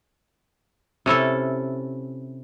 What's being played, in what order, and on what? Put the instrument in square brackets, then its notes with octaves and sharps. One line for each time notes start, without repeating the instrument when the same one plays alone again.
[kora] C3 C#4 E4 A4